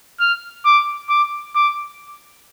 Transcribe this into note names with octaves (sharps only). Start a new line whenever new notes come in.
F6
D6
D6
D6